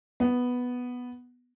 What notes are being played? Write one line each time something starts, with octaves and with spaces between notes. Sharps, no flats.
B3